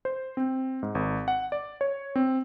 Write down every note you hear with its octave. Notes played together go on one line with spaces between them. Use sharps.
C5
C4
G#2
G#1
F#5
D5
C#5
C4